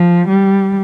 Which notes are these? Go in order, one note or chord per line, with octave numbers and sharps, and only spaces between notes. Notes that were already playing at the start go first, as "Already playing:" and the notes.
Already playing: F3
G3